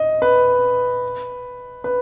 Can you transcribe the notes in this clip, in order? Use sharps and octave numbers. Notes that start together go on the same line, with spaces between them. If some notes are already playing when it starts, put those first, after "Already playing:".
Already playing: D#5
B4
B4